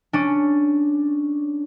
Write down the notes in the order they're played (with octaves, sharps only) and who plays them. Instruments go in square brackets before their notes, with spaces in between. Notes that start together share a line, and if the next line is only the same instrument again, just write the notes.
[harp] C#4 D4